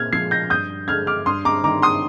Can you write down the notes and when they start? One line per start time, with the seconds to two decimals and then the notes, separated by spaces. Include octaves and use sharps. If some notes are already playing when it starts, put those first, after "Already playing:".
Already playing: A#2 F6 G#6
0.13 F3 G#3 G#6 C7
0.31 G6 A#6
0.50 G2 D#6 G6
0.88 D3 G#3 F6 G#6
1.07 D6 F6
1.26 G2 C6 D#6
1.45 A#5 D6
1.64 D#3 G3 A#5 D6
1.82 C6 D#6